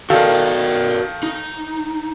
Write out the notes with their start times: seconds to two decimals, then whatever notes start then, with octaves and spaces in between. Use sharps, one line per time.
0.10 D#3 F#4 A4 A#4 D5 F5
1.23 D#4